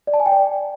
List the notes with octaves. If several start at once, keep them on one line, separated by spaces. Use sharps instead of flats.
D5
A5
G#5
G5
D5